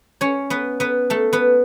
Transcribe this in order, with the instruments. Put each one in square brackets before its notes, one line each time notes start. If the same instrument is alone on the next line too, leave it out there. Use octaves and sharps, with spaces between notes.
[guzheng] C#4 C#5
B3 B4
B3 B4
A3 A4
B3 B4